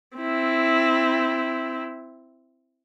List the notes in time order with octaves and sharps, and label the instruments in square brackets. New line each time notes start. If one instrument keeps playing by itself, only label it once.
[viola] C4 E4